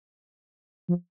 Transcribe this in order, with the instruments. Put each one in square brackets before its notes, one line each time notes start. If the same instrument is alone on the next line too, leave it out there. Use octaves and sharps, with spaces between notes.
[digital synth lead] F3